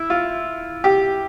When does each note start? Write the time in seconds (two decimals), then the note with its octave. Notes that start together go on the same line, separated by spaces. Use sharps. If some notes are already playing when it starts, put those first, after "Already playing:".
Already playing: E4
0.10 F4
0.84 G4